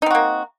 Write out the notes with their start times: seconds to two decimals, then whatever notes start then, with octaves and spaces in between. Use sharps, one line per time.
0.02 D#4
0.06 C4
0.11 F#4
0.15 A#3